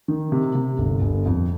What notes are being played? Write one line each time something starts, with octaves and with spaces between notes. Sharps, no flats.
D#3
C3
C3
G1
G1
F2